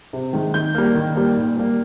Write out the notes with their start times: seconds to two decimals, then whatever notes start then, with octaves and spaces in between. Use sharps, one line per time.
0.13 C3
0.33 D#3 G#3
0.54 D#3 G6
0.75 G3 A#3
0.95 D#3
1.15 G3 A#3
1.37 A#2
1.57 G3 A#3